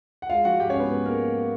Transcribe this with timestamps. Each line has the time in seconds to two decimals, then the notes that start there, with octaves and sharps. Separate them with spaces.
0.22 F#5
0.29 G#3 F4 F5
0.45 F3 F#4 F#5
0.60 G#2 G4 G5
0.70 C#4 C#5
0.75 G#2
0.80 B3 B4
0.90 G#2 B3 B4
1.05 G#3 A#3 A#4